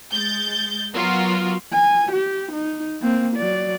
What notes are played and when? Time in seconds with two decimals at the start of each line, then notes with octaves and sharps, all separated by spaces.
0.11 G#3 G6 A6
0.94 F#3 B3 F4 F#4 A#4
1.73 G#5
2.12 G4
2.52 D#4
3.02 A#3 C4
3.37 F#3 D5